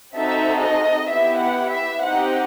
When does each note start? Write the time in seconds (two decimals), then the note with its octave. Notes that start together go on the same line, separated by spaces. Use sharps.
0.16 C4 D#4 F#4 A4 E5
0.63 D#5
1.09 B3 E4 G4 E5
1.41 F#5
1.72 E5
2.03 C4 D#4 G4 F#5